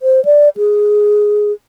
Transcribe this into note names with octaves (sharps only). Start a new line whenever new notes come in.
C5
D5
G#4